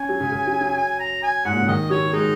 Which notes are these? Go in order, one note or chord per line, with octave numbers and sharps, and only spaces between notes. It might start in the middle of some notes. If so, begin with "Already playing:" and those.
Already playing: C#4 G#5
F#3
C#3
C#3
F#3
F#3
G#5
A#5
G#5
G#2 F#5
A#2
C#3
D#3 D#5
F#3 C#5
G#3 D#4